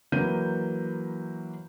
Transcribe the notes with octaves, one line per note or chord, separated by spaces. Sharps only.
E3 F#3 A#3 B4 G6 D#7